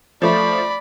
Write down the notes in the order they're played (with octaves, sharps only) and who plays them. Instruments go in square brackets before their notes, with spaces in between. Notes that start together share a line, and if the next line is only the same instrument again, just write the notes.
[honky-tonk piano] F3 A3 [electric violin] D5 B5